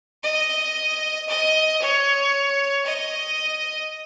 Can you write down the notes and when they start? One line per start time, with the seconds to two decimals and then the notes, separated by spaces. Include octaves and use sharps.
0.23 D#5
1.28 D#5
1.81 C#5
2.85 D#5